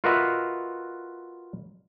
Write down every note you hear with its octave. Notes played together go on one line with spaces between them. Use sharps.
F4 F#4 A#4 B4 D#5 E5